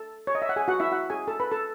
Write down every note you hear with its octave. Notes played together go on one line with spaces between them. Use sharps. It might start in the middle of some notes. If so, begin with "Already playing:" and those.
Already playing: A4 A5
C#5
D#5
E5
F#5
G#4 G#5
F#4 F#5
E4 E5
F#4 F#5
G#4 G#5
A4 A5
B4 B5
A4 A5